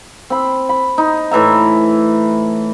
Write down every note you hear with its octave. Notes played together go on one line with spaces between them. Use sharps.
C4 B5
B5
D#4
A2 E3 E5 A#5